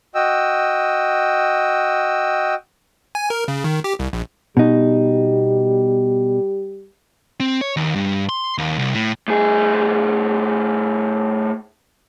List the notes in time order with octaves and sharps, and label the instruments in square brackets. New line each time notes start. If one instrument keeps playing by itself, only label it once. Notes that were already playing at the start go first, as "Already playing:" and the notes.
[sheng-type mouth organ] F#4 D#5 G5 E6
[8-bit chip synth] G#5
A#4
C#3
D#3
G4
C2
A#1
[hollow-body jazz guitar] B2 D#4 [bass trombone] G3
[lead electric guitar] C4
C#5
D#2
G2
C6
D#2
C2
A2
A2 G#4